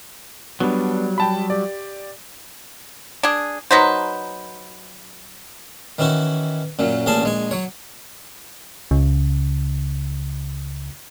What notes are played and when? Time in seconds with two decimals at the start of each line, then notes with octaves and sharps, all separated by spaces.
0.60 F#3 G3 B3 D4
1.18 G5 A5 B5
1.50 G4 D5
3.23 D4 G#4
3.71 F#3 D#4 B4 C5
5.99 D#3 E3 C#4 E4 F#4
6.79 F#2 A#2 F#3
7.06 A1 A#2 C#4 G#4 G#5 A5
7.23 A#1 G#3 G#5
7.51 F#3 C#5
8.91 C#2 C#3